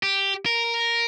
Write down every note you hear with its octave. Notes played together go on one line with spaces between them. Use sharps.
G4
A#4